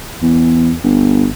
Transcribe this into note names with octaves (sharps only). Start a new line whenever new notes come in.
E2
G1